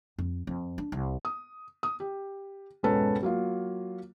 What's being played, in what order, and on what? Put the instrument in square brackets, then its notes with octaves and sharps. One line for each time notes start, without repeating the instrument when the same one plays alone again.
[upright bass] F2
F2
D4
C2
[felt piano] D#6
D#6
G4
E1 C#2 G#2 C#4 A4 B4
F#3 A#3 F4